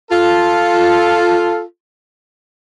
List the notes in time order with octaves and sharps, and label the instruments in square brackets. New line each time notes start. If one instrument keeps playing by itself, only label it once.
[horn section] F4 A4